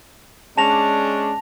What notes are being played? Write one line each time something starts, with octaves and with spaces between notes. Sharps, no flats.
G#3 C#4 D4 A5 A#6 F7